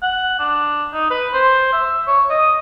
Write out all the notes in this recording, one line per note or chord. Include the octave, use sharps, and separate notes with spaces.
F#5
D4
D#4
B4
C5
E5
C#5
D#5